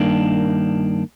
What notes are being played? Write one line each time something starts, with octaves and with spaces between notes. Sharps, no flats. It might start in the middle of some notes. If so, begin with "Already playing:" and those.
Already playing: G2 D#3 A#3 D4